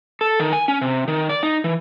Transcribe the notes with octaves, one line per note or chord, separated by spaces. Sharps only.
A4
D#3
G#5
C#4
C3
D#3
D5
D#4
E3